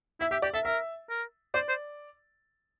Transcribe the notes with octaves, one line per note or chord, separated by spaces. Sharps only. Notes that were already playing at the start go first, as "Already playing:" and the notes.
E4 E5
G4 E5
G4 D5
A4 E5
A#4 E5
A#4
C5 D5
C5